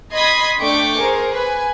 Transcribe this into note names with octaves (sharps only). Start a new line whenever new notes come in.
D#5 B5 C6 D#6 G#6 B6
A3 D4 G5 C#6 D6 C#7
G#4 A#4 C5
B4 G#5